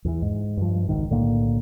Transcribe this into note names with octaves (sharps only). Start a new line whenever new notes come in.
E2 D#3 E3
G#2
G2 F3
G#1 C#2 G#2 D#3
B1 A2 D3 A#3